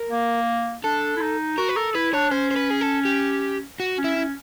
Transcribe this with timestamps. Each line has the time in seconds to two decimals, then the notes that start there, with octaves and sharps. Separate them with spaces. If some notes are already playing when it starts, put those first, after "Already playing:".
Already playing: A#4
0.10 A#3
0.84 D4 A4
1.16 E4
1.21 D#4
1.58 F#4 A#4
1.69 B4
1.76 A4 A#4
1.95 E4 B4
2.13 D4 C#5
2.31 C#4 C5
2.51 C5
2.56 B4
2.70 G#4
2.81 A4
3.05 G4
3.80 F#4
3.98 C#4
4.04 E4
4.16 C#4